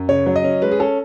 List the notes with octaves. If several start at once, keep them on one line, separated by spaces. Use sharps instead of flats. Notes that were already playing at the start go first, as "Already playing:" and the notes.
Already playing: F#2
C#3 C#5
F#3
D#5
C#4
G#3 B4
G#4
C#4 A4